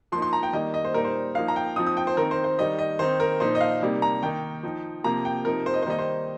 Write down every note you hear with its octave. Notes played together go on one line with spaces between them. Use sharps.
F3 A#3 D#4 C6
C6
A#5
G5
D#3 G3 A#3 D#4 D#5
D#5
C5
A#2 G3 D#4 A#4
C5
F3 A#3 D#4 F5
A#5
G5
F3 C4 D#4 D#6
D#6
G5
C5
D#3 C4 D#4 A#4
C5
C5
D#3 G3 D#4 D#5
D#5
D#3 C4 D#4 C5
A#4
A#2 F3 D#4 C5
D#5
F5
C3 G3 A#3 D#4
A#5
D#3 A#3 D#4 G5
F3 D#4
C3 F3 A#3 A#5
G5
C3 F3 D#4 A#4
C5
D#5
C5
D#3 G3 A#3 D#4 D#5
C5